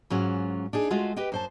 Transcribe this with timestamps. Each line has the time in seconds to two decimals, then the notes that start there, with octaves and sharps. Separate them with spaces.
0.10 G#2 F#3 C#4 F4
0.73 D4 D#4 G#4
0.90 G#3 A3 F4 F#4
1.16 G4 B4 D#5 G5
1.32 F#2 C5 A5